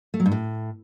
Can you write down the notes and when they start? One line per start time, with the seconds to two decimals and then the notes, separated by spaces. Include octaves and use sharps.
0.14 A3
0.20 F#3
0.26 G2
0.32 A2